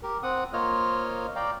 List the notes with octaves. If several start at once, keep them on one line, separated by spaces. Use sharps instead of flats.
G4 A#4
C4 F#5 D#6
A#3 F4 C5 C#5 D#5 F6
D5 F5 G5 A#5